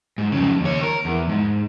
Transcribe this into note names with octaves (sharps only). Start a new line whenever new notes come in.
G#2
F2 C#3
D#2 C#5
A#4
E2
G#2